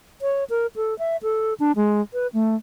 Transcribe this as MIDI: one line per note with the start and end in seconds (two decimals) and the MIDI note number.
0.22 0.44 73
0.50 0.67 70
0.76 0.97 69
0.99 1.17 76
1.23 1.54 69
1.60 1.72 62
1.76 2.01 56
2.13 2.27 71
2.33 2.55 57